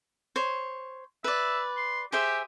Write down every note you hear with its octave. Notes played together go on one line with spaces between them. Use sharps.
C5 C#5
B4 D5 E5
C6
G4 G#4 C5 E5